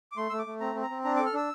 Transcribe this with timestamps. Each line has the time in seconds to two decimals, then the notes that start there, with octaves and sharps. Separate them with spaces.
0.12 D6
0.17 A3 C6
0.30 A3 E6
0.39 D6
0.46 A3
0.60 C4 A#5
0.75 C4
0.83 A#5
0.90 C4
1.04 D4 A#5
1.16 D6
1.19 A4
1.26 F6
1.34 D4 E6